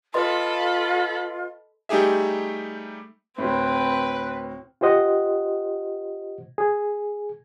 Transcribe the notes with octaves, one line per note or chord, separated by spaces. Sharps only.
F4 A4 B4 D#5 B5 C6
G3 A3 D#4 G4 G#4 E5
D2 A2 C4 B4
F4 G4 C5 D#5 F#5
G#4